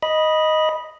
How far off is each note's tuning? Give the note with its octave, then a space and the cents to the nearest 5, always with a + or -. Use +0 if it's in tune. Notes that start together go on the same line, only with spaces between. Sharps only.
D#5 +0 B5 -15